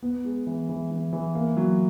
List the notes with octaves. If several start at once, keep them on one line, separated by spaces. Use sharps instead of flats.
B3
G#3
E3
E3
E3
E3
A#3
F#3